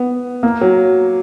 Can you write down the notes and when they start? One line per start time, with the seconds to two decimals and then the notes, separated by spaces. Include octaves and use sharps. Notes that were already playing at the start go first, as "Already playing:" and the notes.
Already playing: B3
0.43 A#3
0.61 F#3